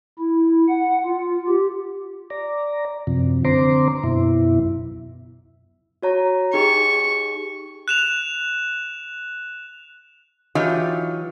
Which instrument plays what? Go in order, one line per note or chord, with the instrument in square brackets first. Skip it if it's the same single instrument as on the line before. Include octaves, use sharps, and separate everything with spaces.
[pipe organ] E4
F#5
F4
G4
[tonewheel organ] D5 A#5
F#2 C3 F3
D3 C4 C5 A#5 C6 D6
F#2 B2 E4
[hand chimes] F#4 C#5 A#5
[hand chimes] D#4 G4 G#4 [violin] C#6
[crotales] F#6 E7 F7
[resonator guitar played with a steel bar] E3 F#3 D#4 F4 G4